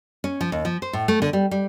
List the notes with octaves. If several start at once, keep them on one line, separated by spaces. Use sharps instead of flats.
C#4
F3
D#2
F3
C5
A2
A3
D3
G3
G3